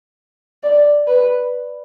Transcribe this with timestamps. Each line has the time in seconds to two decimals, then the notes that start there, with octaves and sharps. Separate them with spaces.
0.63 D5
1.07 B4